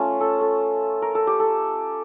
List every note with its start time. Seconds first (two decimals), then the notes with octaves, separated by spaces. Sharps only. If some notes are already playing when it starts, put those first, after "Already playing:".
Already playing: A3 C#4 F4
0.21 A4
0.41 A4
1.02 A#4
1.15 A4
1.27 G4
1.40 A4